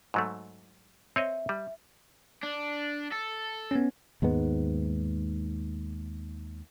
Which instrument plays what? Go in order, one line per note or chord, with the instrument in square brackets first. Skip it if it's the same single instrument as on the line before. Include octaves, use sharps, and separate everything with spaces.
[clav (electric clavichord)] G#2 F#3 A3
[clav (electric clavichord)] C4 C#5 D#5 [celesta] E5
[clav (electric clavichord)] G3
[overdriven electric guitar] D4
A4
[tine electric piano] B3 C#4
[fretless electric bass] D#2 G#2 G#3 B3